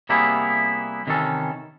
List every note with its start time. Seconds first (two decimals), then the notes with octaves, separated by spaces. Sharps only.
0.09 C3 G3 A#3 B3 E4 G#4
1.07 C3 D#3 E3 C#4 A4